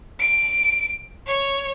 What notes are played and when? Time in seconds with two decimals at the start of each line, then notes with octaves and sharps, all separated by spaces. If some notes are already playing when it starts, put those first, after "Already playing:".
0.20 D7
1.26 C#5